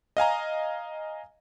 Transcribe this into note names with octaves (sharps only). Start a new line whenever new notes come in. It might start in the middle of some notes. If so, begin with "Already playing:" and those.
D#5 F5 G#5 A#5